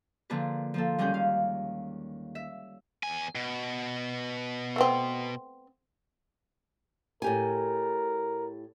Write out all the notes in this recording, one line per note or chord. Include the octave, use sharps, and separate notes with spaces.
D3 F3 A#3 D4 G#4 B4
F3 A#3 A4
D#2 G3 G#3 C#4 G#4 G6
F5
E5
E2 G#5
B2
A3 B3 C4
A2 G4 A#4 G#5